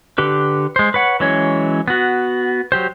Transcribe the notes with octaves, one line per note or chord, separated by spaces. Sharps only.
D3 G4 B4
G#3 C5
B4 C#5 F#5
E3 F#3 G#3 C#4 C#5
B3 F#4
F#3 G4 C5